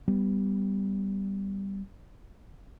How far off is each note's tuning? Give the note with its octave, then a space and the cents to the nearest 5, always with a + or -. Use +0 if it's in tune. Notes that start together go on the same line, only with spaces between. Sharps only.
G3 +0 B3 +10